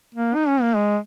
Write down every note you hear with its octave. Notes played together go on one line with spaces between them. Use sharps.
A#3
D#4
C#4
A#3
G#3